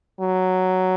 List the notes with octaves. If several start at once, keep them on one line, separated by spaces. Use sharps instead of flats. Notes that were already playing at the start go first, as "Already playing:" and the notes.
F#3